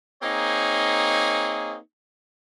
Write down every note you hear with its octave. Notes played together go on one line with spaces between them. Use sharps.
A#3 C4 D#4 G#4 C#5